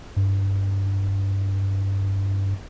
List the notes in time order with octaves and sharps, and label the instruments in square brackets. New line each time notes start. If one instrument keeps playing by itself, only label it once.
[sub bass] G2